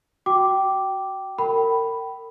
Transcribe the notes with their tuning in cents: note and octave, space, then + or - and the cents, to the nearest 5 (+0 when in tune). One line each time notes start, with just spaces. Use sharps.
F#4 +10 G5 -15 D6 -5
A#4 -35 G5 -25 B5 +0